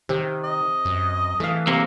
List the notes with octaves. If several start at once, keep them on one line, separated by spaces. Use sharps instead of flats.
C3 D#3
D#5
F#2
E3 A3 F5
C3 A#3